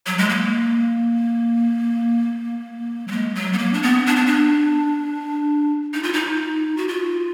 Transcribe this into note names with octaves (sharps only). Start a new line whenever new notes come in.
F#3
G#3
A#3
F#3
G#3
F#3
B3
A#3
D4
B3
D4
B3
D4
D#4
F4
D#4
F#4
F4